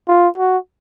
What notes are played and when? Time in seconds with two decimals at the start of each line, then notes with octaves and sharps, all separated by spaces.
0.08 F4
0.38 F#4